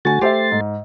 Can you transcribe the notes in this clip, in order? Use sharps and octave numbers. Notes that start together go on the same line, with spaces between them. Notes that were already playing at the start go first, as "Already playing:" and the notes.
D3 A3 F#4 G#5 A6
A3 G4 C5 E5 C6 A6
G#2